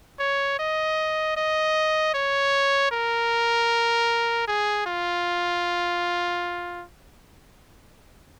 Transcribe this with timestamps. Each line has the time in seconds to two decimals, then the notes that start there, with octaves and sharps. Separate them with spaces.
0.19 C#5
0.59 D#5
1.37 D#5
2.14 C#5
2.91 A#4
4.48 G#4
4.86 F4